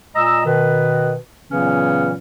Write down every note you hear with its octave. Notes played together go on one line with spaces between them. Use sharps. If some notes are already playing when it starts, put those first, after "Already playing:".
A#2 G#3 D#5 A#5 E6
B2 D#3 B4
A#2 C#3 E3 F#3 B3 C#4